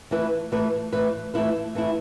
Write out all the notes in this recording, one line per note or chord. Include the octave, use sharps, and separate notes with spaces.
E3 A3 E4 B4
E3 A3 E4 B4
E3 A3 E4 B4
E3 A3 E4 B4
E3 A3 E4